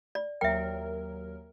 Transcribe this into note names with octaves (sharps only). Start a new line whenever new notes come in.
D5
D#2 F#3 A#4 E5 G5